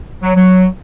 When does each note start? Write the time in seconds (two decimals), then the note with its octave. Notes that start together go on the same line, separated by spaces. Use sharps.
0.21 F#3
0.35 F#3